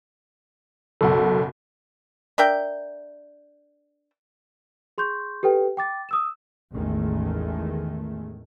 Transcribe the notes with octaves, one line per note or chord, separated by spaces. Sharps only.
F#1 B1 A4 F#5
D4 A#4 E5 G5
G#4 C6 C#6 G6
G4 A4 B4 G5
G5 D6 A6
D#6 E6 E7
A1 E2 D#3 G#3 A3